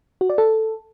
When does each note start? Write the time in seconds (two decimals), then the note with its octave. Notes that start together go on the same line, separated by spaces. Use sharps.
0.21 F#4
0.30 D5
0.38 A4